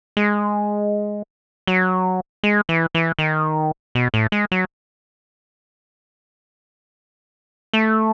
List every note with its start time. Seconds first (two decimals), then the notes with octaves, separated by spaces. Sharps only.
0.17 G#3
1.67 F#3
2.43 G#3
2.69 E3
2.95 E3
3.19 D#3
3.95 B2
4.14 A2
4.32 G#3
4.52 F#3
7.73 A3